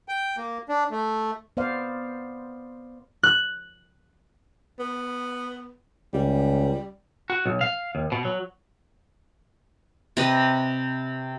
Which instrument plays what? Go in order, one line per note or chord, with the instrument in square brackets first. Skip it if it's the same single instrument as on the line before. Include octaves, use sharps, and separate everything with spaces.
[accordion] G5
A#3
D4
A3
[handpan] B3 C5 D5 F5
[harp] F#6
[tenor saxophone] B3
[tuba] C#2 [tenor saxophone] G3
[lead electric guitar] F#4
B1
F5
D#2
B2
F#3
[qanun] C3 B4 D#5